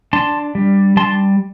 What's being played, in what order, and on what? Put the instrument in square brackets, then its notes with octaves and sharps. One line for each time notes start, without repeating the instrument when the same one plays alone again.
[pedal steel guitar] D4 A5 C6
G3
G3 A5 C6